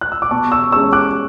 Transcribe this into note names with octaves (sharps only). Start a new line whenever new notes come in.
F#6
E6
D6
B2 A5 C#6
C#6 E6
G#3 C#4 C#6 E6
D6 F#6